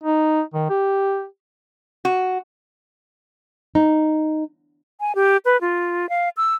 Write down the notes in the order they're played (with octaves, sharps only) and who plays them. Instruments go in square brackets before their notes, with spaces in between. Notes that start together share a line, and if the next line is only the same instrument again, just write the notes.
[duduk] D#4
D#3
G4
[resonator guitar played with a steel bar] F#4
[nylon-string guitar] D#4
[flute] G#5
G4
B4
F4
F5
E6